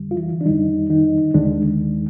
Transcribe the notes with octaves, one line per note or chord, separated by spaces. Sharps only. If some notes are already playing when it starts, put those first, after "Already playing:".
Already playing: F2 D3 G3
F4
E3 E4
D4
F2 D3 D#3 G3 D#4
D#3 D#4
D#2 D3 D#3 G#3 D4